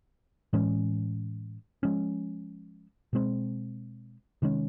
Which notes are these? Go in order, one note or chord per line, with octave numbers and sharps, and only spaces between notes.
A2 E3 G#3 C#4
F3 G#3 C#4
B2 G#3 C4
C3 D#3 G#3 C#4